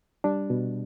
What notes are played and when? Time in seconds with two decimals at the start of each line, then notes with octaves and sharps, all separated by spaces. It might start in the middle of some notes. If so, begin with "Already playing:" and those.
0.24 G3 D4
0.50 B2